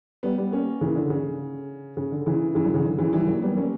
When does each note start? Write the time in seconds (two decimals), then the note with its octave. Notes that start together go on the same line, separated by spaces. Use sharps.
0.23 G3 B3
0.38 G3 B3
0.52 A#3 C#4
0.81 C#3 E3
0.96 D3
1.10 C#3
1.97 C#3
2.12 D3
2.26 C#3 E3
2.55 C#3 E3
2.65 D3 F#3
2.74 C#3 E3
2.84 D3
2.98 C#3 E3
3.13 E3 G3
3.28 F#3 A#3
3.42 G3 B3
3.57 A#3 C#4